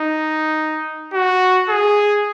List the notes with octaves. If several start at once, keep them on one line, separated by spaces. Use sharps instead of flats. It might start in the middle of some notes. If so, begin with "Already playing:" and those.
Already playing: D#4
F#4
G#4